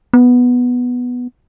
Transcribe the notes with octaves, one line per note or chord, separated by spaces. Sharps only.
B3